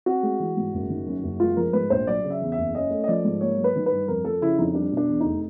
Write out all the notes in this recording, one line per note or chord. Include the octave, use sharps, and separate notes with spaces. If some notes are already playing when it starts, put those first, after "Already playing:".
C4 F#4
G#3
E3
G#2
F#1
D#3
F#2
F#1
G#3 F4
F3 A#4
G#2 B4
A#1 C5
F#3 D5
C#3
E5
E2
E5
F#1
C#4 D#5
A3
D#5
F3 D5
G#2
A#3 C#5
F#3
B4
D#3
B4
G2
F2 A#4
F3 A4
C#3 E4
F2 D#4
G3 D4
B2
D4
E2
F1 D#4